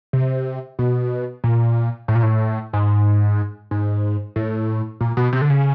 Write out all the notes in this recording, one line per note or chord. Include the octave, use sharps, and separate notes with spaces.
C3
B2
A#2
A2
A#2
A2
G#2
G#2
A2
A#2
B2
C3
D3
C#3